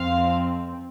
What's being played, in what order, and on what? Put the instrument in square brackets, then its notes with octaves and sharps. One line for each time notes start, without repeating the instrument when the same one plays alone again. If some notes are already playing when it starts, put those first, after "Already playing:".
Already playing: [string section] F2 F3 C4 F5